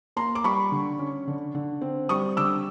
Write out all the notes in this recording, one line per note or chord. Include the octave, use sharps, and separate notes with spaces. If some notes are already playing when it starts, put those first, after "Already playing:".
A#3 A#5 C6
D6
G3 B5 C#6
D3
C#4
D3
D3
C4
G3 C#6 D#6
D3 D6 E6